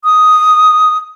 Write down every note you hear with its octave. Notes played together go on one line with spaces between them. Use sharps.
D#6